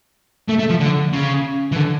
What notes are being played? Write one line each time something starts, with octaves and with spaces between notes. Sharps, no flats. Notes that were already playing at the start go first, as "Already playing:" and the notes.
A3
A3
F3
D3
C#3
E3
D3